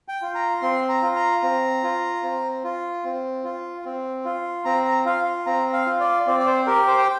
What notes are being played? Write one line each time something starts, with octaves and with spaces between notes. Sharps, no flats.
G5
F4
A#5
C4 C6
A#5
F4
A#5
C4
F4
C4
F4
C4
F4
C4
F4
C4 A#5
A#5
F4 F5
C4 A#5
F5
F4
D5
C4 D5
D5
C5
G4 A#4
C5
G5